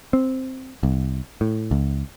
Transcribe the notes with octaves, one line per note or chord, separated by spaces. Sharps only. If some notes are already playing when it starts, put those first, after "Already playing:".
C4
C2
A2
C#2